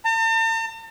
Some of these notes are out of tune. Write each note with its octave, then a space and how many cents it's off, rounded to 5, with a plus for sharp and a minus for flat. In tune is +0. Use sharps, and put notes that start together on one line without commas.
A5 +45